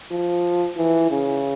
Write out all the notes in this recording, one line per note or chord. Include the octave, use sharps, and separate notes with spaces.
F3
E3
C#3